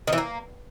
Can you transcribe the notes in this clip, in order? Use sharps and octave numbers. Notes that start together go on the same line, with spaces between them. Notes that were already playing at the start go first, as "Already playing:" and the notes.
D#3
E3
A#3